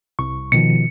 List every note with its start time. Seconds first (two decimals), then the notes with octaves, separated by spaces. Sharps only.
0.19 C2 C#6
0.52 B2 D#3 F3 C#7